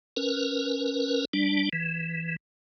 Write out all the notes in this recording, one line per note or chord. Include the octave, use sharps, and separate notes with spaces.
C#4 A#4 B4
G3 D4
E3